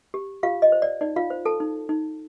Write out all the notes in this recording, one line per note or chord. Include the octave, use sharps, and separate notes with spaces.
G4
F4 G4 F5
D#5
C5
D5
D#4 D5
F4 F5
C5
A4 A5
D#4
D#4